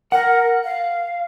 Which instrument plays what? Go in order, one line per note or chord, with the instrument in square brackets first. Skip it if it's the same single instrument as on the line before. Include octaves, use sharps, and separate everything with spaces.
[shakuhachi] A#4 [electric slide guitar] F#5
[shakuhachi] F5